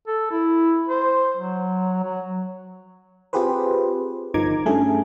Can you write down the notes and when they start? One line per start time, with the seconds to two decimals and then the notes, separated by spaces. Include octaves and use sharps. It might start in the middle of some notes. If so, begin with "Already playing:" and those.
0.07 A4
0.31 E4
0.89 C5
1.37 F#3
2.03 F#3
3.33 C4 F4 G4 G#4 B4 C5
4.34 G1 D#3 F3 A#5 D6 G#6
4.66 G2 A3 C#4 G#4